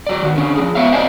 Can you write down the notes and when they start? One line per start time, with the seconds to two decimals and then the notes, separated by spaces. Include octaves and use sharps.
0.07 F#3 D5
0.22 D#3 F#4
0.36 D3 C#4
0.55 F3 G#4
0.75 B3 C#5 E5 F5
0.92 C4 C5 D5 D#5 F5 G#5